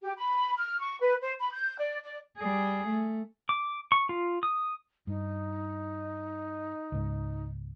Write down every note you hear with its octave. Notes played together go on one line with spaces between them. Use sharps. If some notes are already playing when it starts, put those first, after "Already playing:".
G4
B5
F6
C#6
B4
C5
B5
G6
D5
D5
G3 G#4
A3
D6
C#6
F4
D#6
G2 D#4
C#2 G#2